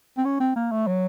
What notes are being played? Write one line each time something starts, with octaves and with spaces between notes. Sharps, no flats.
C4
C#4
C4
A#3
A3
F#3